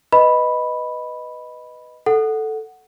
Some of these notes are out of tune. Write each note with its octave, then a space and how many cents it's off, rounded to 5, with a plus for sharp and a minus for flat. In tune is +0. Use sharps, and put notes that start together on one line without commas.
B4 +0 D#5 +0 B5 +0
A4 +0 F#5 +0